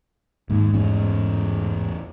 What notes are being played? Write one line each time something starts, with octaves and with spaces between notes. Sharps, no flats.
D#2 G#2
A1 E2 C#4